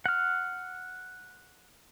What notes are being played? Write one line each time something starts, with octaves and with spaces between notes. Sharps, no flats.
F#5 F6